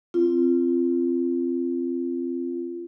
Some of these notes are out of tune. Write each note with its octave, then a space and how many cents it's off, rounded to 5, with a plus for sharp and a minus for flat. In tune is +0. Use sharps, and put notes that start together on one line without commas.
C4 +0 F4 -25